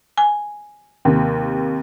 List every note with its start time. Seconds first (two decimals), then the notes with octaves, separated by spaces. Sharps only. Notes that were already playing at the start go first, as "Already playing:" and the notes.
0.18 G#5
1.05 D#2 C3